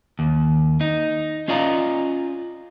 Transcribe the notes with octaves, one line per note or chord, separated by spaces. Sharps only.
D#2
D#4
C#4 F4 D5 D#5 F5 A#5